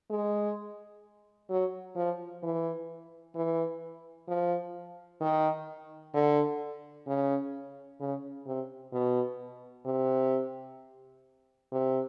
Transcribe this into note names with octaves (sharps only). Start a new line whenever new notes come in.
G#3
F#3
F3
E3
E3
F3
D#3
D3
C#3
C#3
C3
B2
C3
C3